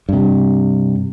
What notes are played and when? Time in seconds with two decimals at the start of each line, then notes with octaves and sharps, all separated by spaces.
0.09 G2 C3